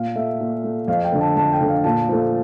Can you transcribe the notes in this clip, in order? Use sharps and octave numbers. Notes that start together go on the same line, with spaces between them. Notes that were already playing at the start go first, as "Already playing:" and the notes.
Already playing: A#2 F5
A3 E5
A#2
A3
F2 F5
G5
D3 A3
A5
F2 A5
G5
D3 A3
F5
A#2 A5
F3 A3